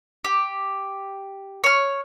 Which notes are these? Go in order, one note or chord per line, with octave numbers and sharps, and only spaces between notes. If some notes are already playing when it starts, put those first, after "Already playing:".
G4
C#5 F6